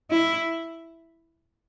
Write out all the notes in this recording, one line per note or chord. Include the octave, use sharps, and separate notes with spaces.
E4